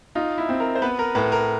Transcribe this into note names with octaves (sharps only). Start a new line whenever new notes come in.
D#4 F4
E4
C4
A#4
C5
B3 B4
A#4
A2 B4
A#4